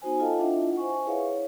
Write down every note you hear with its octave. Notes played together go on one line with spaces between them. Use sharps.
B3 D#4 F#4 C5 G#5
F4 A4 D#5 F5 G5 A5
D4 E4 F4 D#5 E5 F#5
C5 F#5 G#5 C#6
E4 G#4 B4 C#5 E5 F5
C#5